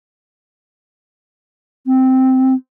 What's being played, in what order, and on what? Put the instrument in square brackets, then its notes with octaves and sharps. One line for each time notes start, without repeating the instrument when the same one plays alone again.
[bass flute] C4